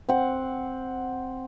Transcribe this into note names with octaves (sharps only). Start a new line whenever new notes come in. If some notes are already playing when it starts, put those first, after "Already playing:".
C4 F#5